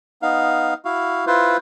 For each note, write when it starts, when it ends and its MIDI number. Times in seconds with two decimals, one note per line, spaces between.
0.22 0.74 59
0.22 0.74 63
0.22 0.74 77
0.85 1.25 64
0.85 1.25 66
0.85 1.25 77
1.27 1.57 64
1.27 1.57 65
1.27 1.57 71
1.27 1.57 72